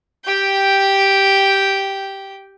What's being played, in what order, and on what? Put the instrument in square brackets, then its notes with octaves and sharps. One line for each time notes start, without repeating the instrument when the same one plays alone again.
[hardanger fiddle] G4 G5